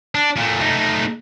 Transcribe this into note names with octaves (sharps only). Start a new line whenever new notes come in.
D4
A#2 A3
A3 D#4